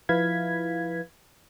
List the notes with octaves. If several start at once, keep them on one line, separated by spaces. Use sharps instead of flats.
F3 E4 B4 F5 G#6 B6